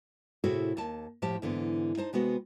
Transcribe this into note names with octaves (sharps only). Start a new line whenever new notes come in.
A2 C3 E4 F#4 G#4 A4
D#2 A5
A2 F3 G4 A5
G#2 D3 E3 B3
D#4 C5 A5
C3 G#3 B3 F#4